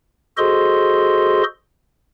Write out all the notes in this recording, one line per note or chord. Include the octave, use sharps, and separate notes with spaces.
F#4 G#4 A4 C5 D#5 C6